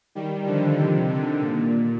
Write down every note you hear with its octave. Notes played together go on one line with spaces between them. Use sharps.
D#3 G3
D3 F3
C3 D#3
D3
A#2